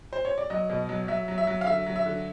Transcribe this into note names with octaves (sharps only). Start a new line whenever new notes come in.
C5
C#5
D5
F#3 D#5
B2
F#3
F#3 E5
F#3
E5
F#3
F5
D3 E5
F#3
E5
D3